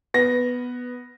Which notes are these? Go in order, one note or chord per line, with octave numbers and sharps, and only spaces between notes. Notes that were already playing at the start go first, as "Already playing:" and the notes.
B3 A#6